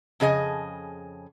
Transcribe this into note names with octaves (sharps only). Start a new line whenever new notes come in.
F2 C#3 G#4 D#5 G#5